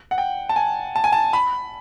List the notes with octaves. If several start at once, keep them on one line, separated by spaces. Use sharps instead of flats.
F#5
G5
A5
G#5
A5
G#5
A5
B5